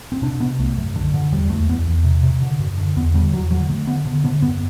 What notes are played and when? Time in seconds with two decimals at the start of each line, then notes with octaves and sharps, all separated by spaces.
0.12 C4
0.22 C3 D4
0.40 C3 B3
0.58 C2 A3
0.77 F#2
0.96 D3
1.14 D3
1.32 E2 G3
1.50 E2 A3
1.69 E2 B3
1.87 E2
2.04 C3
2.23 C3
2.42 D3
2.59 F#2
2.77 D3
2.96 E2 B3
3.14 D3 G3
3.33 E2 F#3
3.51 D3 F#3
3.69 D3 A3
3.87 D3 B3
4.05 D3
4.24 D3 B3
4.42 F#2 B3